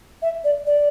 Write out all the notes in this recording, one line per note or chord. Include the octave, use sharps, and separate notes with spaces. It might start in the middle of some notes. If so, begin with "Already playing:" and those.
E5
D5
D5